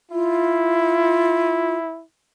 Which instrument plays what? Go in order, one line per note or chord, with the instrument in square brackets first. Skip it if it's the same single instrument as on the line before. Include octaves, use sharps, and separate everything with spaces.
[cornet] E4 [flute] F4